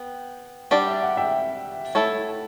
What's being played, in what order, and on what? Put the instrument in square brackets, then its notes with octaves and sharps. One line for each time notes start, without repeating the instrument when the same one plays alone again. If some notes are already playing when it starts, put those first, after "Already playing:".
Already playing: [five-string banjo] B3 [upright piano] G5
[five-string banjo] G3 D4 G4 D5 [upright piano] F#5
[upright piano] E5
F#5
E5 G5
[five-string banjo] A3 E4 A4 C#5